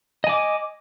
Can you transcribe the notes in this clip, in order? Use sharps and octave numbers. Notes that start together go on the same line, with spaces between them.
D#5 G#5 D6